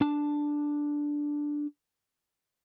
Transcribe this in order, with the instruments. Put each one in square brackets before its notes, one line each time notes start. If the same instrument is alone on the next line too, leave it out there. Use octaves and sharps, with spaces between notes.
[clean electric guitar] D4 A5